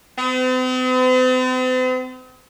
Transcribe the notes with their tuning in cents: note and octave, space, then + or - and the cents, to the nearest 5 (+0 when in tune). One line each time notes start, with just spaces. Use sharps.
C4 -45